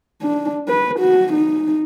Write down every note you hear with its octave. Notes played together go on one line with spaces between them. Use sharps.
D4
B4
F#4
D#4